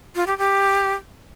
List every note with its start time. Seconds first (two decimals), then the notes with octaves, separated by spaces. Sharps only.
0.15 F4
0.27 G4
0.38 G4